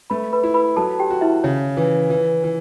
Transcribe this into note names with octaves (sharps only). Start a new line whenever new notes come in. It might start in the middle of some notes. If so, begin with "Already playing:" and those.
A3 B4 B5
B4 B5
E4
B4 B5
F#3 A4 A5
G4 G5
F#4
E4 E5
C#3 C#5
E3
E3
E3